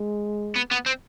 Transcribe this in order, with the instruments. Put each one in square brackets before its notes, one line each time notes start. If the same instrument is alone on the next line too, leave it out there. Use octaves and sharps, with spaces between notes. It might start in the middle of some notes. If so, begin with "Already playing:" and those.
Already playing: [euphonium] G#3
[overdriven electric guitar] B3
B3
C4